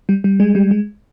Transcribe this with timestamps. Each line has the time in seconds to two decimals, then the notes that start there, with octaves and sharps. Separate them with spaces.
0.09 G3
0.24 G3
0.40 G#3
0.55 G3
0.71 G#3